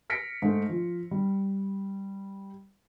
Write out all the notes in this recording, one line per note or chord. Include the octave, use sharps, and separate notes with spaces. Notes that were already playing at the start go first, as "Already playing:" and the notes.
F6 A#6 B6 C#7 D7
G#2 A3
F3
G3